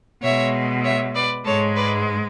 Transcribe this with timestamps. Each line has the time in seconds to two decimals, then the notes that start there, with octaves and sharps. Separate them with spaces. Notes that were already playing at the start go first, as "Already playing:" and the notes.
0.23 B2 G#3 C#5 E5
0.84 C#5 E5
1.15 B4 D5
1.45 G#2 G#3 A4 C#5
1.76 B4 D5